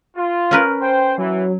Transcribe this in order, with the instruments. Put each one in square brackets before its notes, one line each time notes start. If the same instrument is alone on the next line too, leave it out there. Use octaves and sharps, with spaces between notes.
[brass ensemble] F4
[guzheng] C#4 A#4 B4
[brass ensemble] C5 [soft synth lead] G5
[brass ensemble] E3 [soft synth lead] F#3